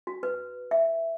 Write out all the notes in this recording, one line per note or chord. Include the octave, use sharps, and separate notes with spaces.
F#4
B4
E5